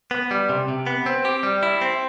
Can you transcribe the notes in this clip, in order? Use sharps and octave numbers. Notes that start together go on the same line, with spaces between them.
B3
G3
C3
C3
B3
C4
G4
G3
E4
C4